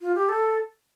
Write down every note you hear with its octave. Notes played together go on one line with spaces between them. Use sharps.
F4
G4
A4